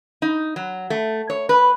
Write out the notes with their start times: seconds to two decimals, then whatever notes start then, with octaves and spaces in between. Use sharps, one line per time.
0.22 D#4
0.56 F#3
0.90 A3
1.30 C#5
1.49 B4